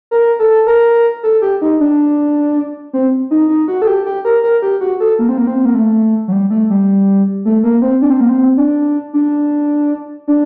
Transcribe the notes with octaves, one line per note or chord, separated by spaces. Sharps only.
A#4
A4
A#4
A4
G4
D#4
D4
C4
D#4
D#4
F#4
A4
G4
G4
A#4
A#4
G4
F#4
A4
A#3
C4
A#3
C4
A#3
A3
F#3
G3
A3
G3
A3
A#3
C4
D4
C4
A#3
C4
D4
D4
D4